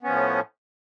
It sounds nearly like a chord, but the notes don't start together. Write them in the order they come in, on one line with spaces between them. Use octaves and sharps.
B3 C#4 F3 A2